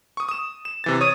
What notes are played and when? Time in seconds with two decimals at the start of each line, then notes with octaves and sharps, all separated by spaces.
0.17 C#6 D#6
0.29 D#6 E7
0.65 E7
0.84 C3 E3 A6
1.01 C#5 D#6